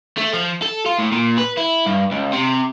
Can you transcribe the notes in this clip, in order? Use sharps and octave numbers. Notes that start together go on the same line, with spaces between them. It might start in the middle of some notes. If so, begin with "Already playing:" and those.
A3
F3
A4
F4
A2
A#2
B4
E4
G2
C#2
C3